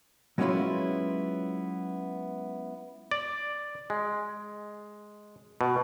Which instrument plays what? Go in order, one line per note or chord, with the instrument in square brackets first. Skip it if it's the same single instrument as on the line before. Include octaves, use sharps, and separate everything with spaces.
[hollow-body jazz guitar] F#3 G#3 B3 C#4 E4 F4
[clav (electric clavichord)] D5
G#3
B2